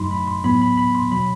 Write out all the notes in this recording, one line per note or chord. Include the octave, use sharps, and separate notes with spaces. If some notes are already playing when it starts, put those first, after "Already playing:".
Already playing: F#2 F#3 A3 D#4 B5 C6
B5
C6
A2 F#3 B3 B5
B5
B5
C6
B2 F#3 B5